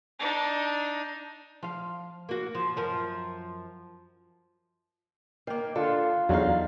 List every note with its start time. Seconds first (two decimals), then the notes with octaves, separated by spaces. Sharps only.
0.19 D4 D#4
1.63 F3 F5
2.29 A#3 F#4
2.55 F3
2.76 F#2 F3 A#4
5.47 D#3 A#3
5.75 D3 F4 A4
6.29 E2 D3 F#3 D#4 F5